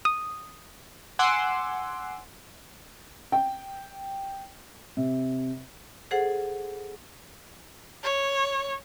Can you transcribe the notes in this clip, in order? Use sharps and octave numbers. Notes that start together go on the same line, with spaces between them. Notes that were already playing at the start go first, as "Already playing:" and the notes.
D#6
F#5 G#5 C6 D6 E6
G5
C3
G#4 A4 C5 F#5
C#5